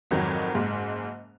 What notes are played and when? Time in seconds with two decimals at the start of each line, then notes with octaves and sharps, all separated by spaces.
0.11 G#1 F2 D#3 F#3
0.55 F#1 G#2